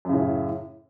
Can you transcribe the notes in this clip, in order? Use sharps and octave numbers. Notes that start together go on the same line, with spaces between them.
F#2 A2 C#3